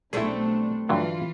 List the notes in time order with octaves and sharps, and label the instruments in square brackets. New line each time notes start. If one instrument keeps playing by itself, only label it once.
[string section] B1 D4 [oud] G3 A3 C4 [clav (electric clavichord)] E4 G#4
[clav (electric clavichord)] G2 D3 F#3 [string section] E3 F4